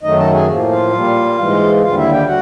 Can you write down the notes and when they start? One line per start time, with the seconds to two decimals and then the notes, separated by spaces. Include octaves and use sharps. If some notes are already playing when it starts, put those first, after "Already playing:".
0.03 F#2 D#3 F#3 A3 D#4 D#5
0.18 A4 A5
0.33 G#4 G#5
0.48 A2 F3 A#3
0.70 F4 F5
0.93 A#2 G3 A#3
1.38 G#2 E3 G#3
1.82 D#2 D3 G3 F4 F5
1.97 E4 E5
2.11 G4 G5
2.26 F#4 F#5